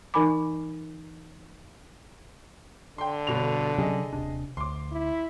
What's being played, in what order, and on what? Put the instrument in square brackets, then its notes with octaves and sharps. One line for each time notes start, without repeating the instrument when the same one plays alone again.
[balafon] E3 D#4 A#4 G#5 B5 D6
[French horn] D3 [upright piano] G5 C6
[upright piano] G1 B2 F7
[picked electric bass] C3 F#3 C#4 [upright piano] G#4 D#5
[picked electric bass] D#1 C3 D4
[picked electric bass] D2 [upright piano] C6 D6
[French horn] E4